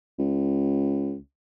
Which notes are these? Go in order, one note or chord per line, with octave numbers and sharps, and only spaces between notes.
C#2